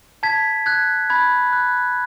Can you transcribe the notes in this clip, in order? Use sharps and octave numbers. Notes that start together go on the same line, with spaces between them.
A5 G#6 B6
F#6 G#6
B5 G#6
F#6